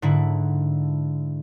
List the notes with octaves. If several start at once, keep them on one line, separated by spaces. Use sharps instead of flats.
G#2 D3 E4